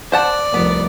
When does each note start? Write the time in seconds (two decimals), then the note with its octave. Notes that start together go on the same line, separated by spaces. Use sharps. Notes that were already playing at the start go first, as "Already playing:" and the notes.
0.12 C5 D5 F#5 A5
0.54 F1 C2 B3